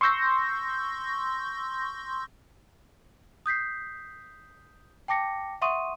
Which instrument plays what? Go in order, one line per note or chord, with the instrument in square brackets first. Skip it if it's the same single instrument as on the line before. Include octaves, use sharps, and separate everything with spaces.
[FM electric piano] C6 C#6 E6 G6 A#6
[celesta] D#6 G6 B6 C7
G5 A5 D6 A#6 C#7
E5 F#5 C6 C#6 D#6 D#7